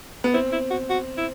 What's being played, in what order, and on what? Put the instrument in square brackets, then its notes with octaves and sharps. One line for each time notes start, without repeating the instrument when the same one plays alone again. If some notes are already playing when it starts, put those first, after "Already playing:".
[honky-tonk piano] B3
[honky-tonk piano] C4 [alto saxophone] E4
[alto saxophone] E4
F#4
F#4
E4